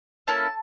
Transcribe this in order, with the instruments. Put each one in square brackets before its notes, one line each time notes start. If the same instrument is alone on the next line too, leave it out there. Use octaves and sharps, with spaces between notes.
[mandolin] A#3 C#4 E4 A4 A5